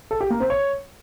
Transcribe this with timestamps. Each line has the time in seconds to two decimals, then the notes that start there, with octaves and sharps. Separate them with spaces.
0.11 A4
0.21 G4
0.30 A#3
0.40 C4
0.50 C#5